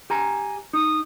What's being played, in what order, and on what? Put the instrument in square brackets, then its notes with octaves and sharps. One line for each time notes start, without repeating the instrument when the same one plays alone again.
[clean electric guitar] G4 G#5 A#5
[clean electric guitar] D#4 [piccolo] D#6